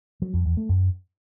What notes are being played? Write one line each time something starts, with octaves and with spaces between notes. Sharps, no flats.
F#3
F2
E2
A3
F#2